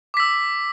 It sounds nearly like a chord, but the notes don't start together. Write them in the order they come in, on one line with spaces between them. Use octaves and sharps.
D6 B6 E6